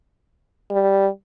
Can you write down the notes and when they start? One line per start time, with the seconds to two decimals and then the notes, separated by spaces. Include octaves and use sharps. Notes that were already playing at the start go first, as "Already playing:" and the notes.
0.71 G3